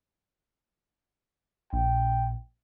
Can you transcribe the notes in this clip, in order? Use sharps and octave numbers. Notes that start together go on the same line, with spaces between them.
A#1 G5